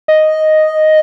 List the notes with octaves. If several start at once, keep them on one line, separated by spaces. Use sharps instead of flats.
D#5